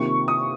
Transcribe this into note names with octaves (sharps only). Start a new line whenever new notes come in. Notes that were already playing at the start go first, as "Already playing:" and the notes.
Already playing: C3 D#3 A#3 F4 C#6
D#6